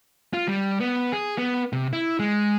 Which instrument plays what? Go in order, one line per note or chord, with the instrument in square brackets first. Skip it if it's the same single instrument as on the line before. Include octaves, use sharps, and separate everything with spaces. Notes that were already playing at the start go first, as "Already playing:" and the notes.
[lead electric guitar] F4
G3
B3
G#4
B3
C3
E4
G#3